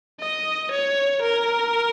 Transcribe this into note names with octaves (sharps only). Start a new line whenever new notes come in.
D#5
C#5
A#4